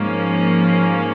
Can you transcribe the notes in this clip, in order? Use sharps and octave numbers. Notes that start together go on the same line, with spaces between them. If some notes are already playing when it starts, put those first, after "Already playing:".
Already playing: G#2 F3 A#3 C#4